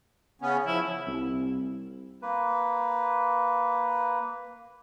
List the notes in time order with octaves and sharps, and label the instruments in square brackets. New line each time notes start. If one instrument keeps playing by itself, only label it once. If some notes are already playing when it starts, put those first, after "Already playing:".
[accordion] C#3 B3 C#4
[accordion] F3 [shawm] E4
[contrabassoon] C2
[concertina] A#3 B4